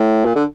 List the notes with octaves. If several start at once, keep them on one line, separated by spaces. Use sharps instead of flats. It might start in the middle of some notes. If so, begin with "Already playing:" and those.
Already playing: A2
A#2
D3